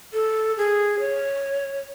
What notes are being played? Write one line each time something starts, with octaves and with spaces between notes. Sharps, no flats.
A4
G#4
C#5